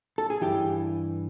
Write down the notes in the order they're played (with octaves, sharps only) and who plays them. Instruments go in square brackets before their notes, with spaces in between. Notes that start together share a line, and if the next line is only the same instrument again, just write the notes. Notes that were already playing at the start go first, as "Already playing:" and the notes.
[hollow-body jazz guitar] A4
G#4
G2 E3 G4